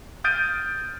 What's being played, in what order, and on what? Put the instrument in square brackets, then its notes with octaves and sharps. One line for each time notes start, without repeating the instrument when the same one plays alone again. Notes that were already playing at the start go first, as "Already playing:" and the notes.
[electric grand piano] D#6 F6 G6 A6 D7 D#7